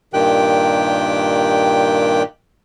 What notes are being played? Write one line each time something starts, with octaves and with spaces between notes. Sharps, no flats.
G2 A#2 D#3 G4 G5 F#6